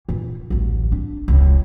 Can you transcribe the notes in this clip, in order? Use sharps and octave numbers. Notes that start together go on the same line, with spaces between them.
A#2 E3
A1 D2
D4
E1 C#2